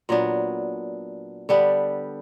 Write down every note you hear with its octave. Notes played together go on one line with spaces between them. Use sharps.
A#2 F#3 B3 D4
D3 G3 B3 D4